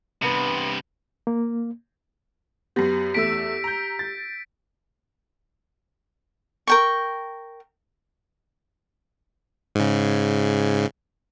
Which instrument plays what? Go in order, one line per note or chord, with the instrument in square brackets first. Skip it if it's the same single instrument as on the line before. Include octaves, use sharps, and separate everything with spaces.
[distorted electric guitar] G2 C3 [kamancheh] B3
[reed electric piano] A#3
[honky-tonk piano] F#2 B3 [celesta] G4 [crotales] G6 A#6
[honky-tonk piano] E2 A3 E6 [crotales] B6 D7
[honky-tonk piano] A#5 G6
A6
[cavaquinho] A#4 G5 C#6
[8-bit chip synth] G#2 C#3